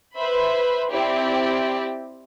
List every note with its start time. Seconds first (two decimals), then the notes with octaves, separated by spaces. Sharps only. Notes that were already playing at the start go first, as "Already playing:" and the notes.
0.16 B4 C5 E5 B5
0.90 C4 E4 G4 D5